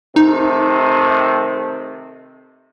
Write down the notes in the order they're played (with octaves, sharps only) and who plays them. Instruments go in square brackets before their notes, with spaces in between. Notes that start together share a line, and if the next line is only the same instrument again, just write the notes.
[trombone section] C3 D#3 A3 [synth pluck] D#4